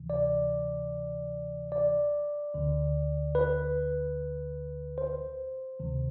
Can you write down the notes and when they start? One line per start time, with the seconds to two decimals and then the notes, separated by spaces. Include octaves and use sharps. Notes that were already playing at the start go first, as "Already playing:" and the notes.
Already playing: D2 C3 E3
0.10 D5
1.72 D5
2.54 D2 D3
3.35 B4
4.98 C5
5.79 D2 C3 D#3